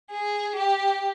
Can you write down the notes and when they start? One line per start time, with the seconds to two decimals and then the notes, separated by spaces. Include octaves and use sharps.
0.11 G#4
0.57 G4